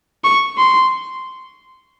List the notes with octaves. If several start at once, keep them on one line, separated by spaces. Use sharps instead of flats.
C#6
C6